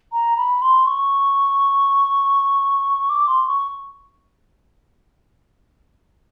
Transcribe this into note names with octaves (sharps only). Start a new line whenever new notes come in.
A#5
B5
C6
C#6
D6
C6
C#6